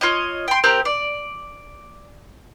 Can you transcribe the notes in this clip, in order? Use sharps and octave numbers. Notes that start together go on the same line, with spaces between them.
F4 C#5 D#5
G5 C6
C4 G4 A#4
D5